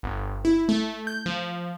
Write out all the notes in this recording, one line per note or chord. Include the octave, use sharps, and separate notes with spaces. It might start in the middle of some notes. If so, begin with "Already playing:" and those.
G1
E4
A3
G6
F3